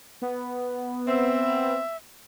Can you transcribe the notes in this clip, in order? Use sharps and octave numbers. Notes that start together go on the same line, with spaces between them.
B3
C4 E5